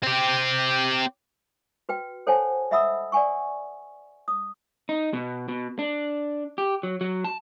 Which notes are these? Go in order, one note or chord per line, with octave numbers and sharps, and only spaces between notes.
C4 G4
F#4 B4 G5
A4 C5 C#5 F#5 G#5 A5
D#5 E5 F#5 B5 D#6 E6
D5 F#5 G#5 C#6
D#6
D#4
B2
B2
D4
G4
F#3
F#3
A5